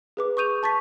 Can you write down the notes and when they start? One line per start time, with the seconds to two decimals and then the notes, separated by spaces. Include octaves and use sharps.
0.17 G#4 B4 D6
0.37 C#6 D#6 G6 D#7 F7
0.63 A5 C#6 A6 B6